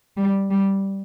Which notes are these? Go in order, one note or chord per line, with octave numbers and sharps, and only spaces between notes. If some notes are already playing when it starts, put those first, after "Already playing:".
G3
G3